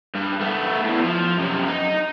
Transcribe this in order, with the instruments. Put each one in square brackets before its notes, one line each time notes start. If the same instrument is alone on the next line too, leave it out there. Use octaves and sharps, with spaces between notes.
[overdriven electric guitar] G2
A3 B3
E2 A2
F3
F#2 C3
D#4